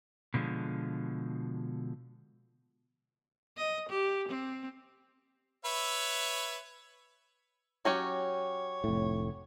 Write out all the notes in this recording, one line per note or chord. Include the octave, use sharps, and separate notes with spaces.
B2 D3 F3 G#3
D#5
G4
C4
B4 C#5 E5
F#3 C#4 G4 C#5
F1 A2